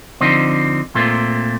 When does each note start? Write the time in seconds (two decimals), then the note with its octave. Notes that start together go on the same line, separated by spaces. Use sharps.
0.21 D3 F3 C4 D#4
0.95 A#2 A3 C4 F4